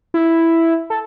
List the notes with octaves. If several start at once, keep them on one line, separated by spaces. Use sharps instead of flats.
E4
A4